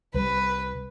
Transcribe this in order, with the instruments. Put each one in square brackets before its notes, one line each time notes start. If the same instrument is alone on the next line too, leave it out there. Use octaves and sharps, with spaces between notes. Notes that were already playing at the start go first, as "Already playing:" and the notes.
[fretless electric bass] C2 G3 [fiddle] B4